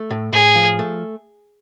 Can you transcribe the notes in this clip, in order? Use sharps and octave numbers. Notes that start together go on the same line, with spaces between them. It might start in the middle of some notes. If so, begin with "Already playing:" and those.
Already playing: A3
A2
A2 G#4
F3
A3